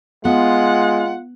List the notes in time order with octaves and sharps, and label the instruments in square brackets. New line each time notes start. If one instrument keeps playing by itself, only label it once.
[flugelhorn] G#3 [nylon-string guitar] B3 [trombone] F4 [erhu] F#5